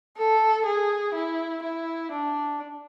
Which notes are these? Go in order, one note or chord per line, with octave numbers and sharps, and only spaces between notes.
A4
G#4
E4
E4
D4